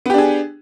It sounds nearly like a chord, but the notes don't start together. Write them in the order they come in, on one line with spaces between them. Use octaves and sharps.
B3 G4 D4 G#4